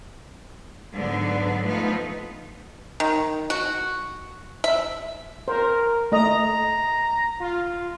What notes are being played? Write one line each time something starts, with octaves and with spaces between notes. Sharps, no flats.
G#2 D3 F#3 B3 D4
F3 A3 B3 D#4 F4
D#3
F#4
E5
A#4 C5
A3 D#5 A#5
F4